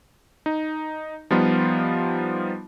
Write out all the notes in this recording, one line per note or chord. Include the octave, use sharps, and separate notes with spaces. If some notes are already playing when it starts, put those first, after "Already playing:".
D#4
F3 G3 B3 D#4 F4